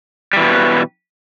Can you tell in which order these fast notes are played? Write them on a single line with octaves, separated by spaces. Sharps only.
G3 E3 B2